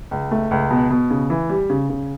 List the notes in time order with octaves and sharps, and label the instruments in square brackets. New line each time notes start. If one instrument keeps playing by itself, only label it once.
[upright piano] C#2
A3
C#2
B2
B2
C#3
E3
G3
C#3
C#3